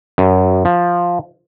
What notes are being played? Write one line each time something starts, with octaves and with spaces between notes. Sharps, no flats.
F#2
F3